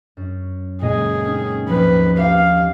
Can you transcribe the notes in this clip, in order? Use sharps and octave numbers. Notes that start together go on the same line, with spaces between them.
F#2
A#2 C#3 G#3 G#4 D#5 G#5
C4 C#4 D#4
D#2 G#2 F3 B4
G4 F5